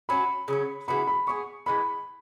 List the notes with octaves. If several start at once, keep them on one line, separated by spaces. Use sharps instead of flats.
F#3 C#4 F#4 B5
C#3 F#3 C#4
C#3 E3 B3 F#4 B5
B5
B3 E4 G#4 C#6
E3 G#3 B3 B5